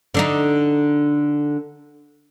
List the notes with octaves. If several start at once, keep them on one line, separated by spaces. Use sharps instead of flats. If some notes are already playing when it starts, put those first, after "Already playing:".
D3 D4 D#4